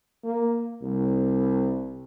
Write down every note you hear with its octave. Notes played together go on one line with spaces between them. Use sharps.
A#3
C2